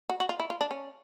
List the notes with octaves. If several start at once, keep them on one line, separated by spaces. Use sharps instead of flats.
F#4
F#4
F4
E4
F4
D4
C#4